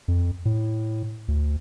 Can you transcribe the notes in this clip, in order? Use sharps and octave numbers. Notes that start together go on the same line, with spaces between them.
F2
A2
D2